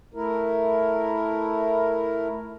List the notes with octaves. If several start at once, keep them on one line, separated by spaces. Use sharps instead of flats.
A3 E4 A#4